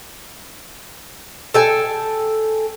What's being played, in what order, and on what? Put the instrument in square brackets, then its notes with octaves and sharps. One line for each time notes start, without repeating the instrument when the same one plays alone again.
[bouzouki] A4 G5 G#5